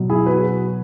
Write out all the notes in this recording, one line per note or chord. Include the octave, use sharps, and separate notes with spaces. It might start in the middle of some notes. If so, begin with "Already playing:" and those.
Already playing: B2 F#3
E4 G#4
F#4 B4